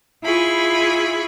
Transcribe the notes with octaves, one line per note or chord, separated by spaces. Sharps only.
E4 F4 G#4 B5 C#6